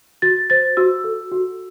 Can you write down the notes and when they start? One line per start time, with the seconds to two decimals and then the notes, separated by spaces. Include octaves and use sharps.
0.22 F#4 A6
0.50 C5 A6
0.77 F#4 E6
1.04 A4
1.31 F#4